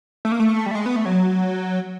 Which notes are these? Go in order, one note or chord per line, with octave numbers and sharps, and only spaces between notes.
A3
A#3
A3
G3
A3
G#3
B3
A3
F#3